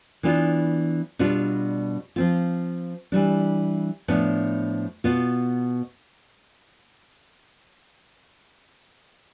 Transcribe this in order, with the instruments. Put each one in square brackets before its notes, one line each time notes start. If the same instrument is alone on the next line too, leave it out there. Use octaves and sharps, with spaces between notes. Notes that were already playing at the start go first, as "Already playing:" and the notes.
[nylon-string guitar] E3 B3 D4 F4
B2 G3 D4 F4
F3 C4 F4
E3 G3 D4
A2 F3 B3 D4
B2 B3 F4